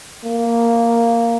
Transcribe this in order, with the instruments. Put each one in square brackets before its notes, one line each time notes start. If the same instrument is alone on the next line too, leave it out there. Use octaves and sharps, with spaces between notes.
[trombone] A#3